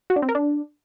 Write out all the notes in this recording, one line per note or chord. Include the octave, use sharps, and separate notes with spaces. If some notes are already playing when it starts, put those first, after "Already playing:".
F#4
D4
C4
A#4
D4